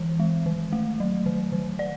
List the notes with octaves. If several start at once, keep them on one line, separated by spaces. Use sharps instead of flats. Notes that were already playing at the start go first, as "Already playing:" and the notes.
Already playing: E3
G#3
D#3
A3
F#3
D#3
D#3
D5